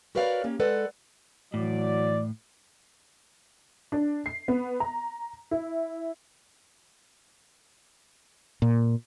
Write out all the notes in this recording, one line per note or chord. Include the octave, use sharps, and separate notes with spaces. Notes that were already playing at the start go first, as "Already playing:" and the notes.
F#4 A#4 B4 C#5 D5 F5
A#3 C#4 G4
G#3 A4 B4 D5 F#5
A2 E3 F#3 D5
D4
C7
B3
A#5
E4
A#2